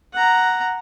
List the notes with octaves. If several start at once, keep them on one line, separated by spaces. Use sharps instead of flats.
F#5 A#5